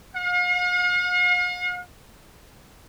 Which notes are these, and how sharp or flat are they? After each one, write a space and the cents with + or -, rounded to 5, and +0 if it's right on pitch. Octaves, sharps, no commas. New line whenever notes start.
F5 +45